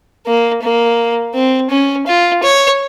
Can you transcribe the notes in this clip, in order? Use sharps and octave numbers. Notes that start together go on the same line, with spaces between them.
A#3
A#3
C4
C#4
F4
C#5